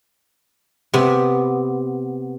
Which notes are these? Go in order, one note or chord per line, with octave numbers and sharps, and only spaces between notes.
C3 B3